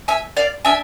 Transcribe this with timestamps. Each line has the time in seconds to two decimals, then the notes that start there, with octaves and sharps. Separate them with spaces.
0.08 E5 G#5
0.37 D5 F5
0.65 D4 E5 G#5